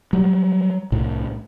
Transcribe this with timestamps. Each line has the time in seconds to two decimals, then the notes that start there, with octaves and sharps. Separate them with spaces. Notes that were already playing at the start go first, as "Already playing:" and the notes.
0.13 F#3 G3
0.92 C2 A2